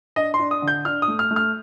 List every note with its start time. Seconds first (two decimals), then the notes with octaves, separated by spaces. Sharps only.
0.16 D4 D#5
0.34 C6
0.39 D4
0.51 D#6
0.62 D3
0.68 G6
0.85 D4 F6
1.02 D#6
1.08 A3
1.19 F6
1.31 A3
1.36 F6